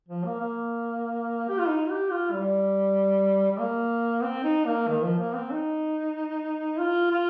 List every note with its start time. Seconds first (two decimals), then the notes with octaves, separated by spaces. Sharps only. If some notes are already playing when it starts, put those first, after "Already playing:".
0.09 F3
0.24 A#3
0.40 A#3
1.49 G4
1.58 F4
1.68 D#4
1.90 G4
2.11 F4
2.33 G3
3.52 G3
3.59 A#3
4.23 C4
4.44 D#4
4.66 A#3
4.88 D#3
5.03 F3
5.19 A#3
5.35 C4
5.51 D#4
6.79 F4
7.11 F4